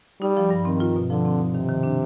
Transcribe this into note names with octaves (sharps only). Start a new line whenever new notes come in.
G3 D#4
F3
G2
D#3 C4
F4
B2
D3 F3
C4
D#4
C3 D#3
D#3
D4